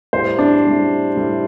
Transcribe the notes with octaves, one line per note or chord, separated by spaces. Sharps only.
A2 G3 C5
D4
A2 G3
A2 G3